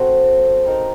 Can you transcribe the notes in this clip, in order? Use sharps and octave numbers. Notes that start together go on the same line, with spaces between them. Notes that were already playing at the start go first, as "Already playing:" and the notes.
Already playing: C4 F#4 A4 C5
C4 D#4 A#4